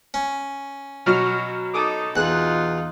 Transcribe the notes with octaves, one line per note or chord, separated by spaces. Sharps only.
C#4
B2 F#3 F#4 F6
D#4 A4 D6 D#6
E2 D#4 F4 F#6